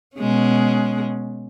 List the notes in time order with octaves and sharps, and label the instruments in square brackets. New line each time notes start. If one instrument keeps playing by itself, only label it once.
[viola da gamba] B2 G#3 C#4